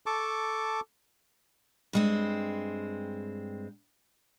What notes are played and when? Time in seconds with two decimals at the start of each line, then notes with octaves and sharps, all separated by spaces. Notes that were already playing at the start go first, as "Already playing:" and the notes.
0.06 A4 A5 C#6 D6
1.93 G2 G#3 C4